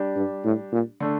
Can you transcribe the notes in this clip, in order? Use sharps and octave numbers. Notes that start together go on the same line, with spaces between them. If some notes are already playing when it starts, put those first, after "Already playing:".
Already playing: G3 D4 G4
G2
A2
A#2
D3 A3 D4